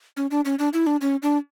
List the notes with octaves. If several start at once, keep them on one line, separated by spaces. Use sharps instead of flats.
C#4
D4
C#4
D4
E4
D4
C#4
D4